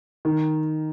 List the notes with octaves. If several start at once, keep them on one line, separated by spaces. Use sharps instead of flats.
D#3